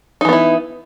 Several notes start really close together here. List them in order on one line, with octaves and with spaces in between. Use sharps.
D#4 E3 B3 E4